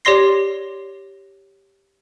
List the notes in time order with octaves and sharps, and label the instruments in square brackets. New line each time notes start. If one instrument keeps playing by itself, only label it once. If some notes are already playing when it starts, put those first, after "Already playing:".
[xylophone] G4 C#5 D5 C6 A#6 C7